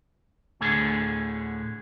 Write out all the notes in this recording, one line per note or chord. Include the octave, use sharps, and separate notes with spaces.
D2 A2 D3 G#4